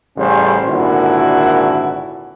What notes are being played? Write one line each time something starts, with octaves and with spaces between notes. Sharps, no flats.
A1 C#3 G3 C#4 C5
G#1 A#2 D3 E4 F#4